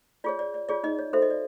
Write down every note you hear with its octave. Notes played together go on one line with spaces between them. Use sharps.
F4 G#4 C#5 D5
D5
D5
F4 G#4 C#5 D5
D#4 D#5
C#5
F#4 A4 C5 E5
D#5
D5